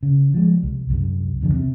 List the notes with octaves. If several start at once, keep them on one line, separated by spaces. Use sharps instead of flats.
C#3
F3 G#3
C2
C2 F#2
E1 F2 D3 E3
C3 C4